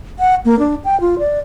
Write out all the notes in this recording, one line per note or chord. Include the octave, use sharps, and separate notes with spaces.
F#5
A#3
D4
G5
F4
D5